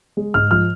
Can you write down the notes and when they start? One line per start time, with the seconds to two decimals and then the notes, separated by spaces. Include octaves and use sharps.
0.17 G#3
0.34 G#2 F6
0.51 F3 F6